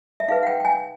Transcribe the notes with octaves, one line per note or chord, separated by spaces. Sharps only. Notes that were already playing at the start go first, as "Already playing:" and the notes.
E5
D#4 G#4 B4 F5
F#5
G5
G5
G#5